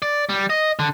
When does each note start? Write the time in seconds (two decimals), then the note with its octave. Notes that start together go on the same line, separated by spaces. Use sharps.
0.02 D5
0.29 G3
0.50 D#5
0.79 D3